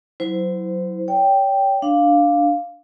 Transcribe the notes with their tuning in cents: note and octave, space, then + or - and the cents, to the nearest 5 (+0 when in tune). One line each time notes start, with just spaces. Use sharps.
F#3 +0 E4 +0 C5 -25
C#5 +35 G5 +0
D4 +0 F5 +0